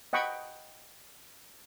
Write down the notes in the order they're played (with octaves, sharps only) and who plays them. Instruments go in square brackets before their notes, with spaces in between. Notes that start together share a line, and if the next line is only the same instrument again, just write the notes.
[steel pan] D#5 F#5 G5 B5 C#6